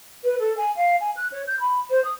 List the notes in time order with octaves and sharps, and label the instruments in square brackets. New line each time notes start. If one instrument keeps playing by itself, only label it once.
[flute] B4
A4
G#5
F5
G#5
F#6
C#5
G6
B5
C5
D#6